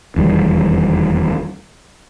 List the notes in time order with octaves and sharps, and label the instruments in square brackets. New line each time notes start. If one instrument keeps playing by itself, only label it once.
[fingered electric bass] F1 E2 D#3 G3